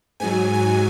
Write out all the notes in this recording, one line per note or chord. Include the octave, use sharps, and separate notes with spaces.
G#2 F#3 G#5
G#5